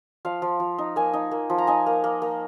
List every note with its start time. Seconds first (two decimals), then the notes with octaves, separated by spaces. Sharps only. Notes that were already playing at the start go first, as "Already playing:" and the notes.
0.25 F3 F5
0.42 F3
0.60 F3
0.78 D#4
0.96 A#3 G#5
1.14 D#4
1.31 A#3
1.50 F3
1.58 A#5
1.67 D#4 G#5
1.86 A#3
2.04 A#3
2.22 A#3